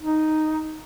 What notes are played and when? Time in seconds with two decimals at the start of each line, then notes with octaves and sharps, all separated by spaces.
0.02 D#4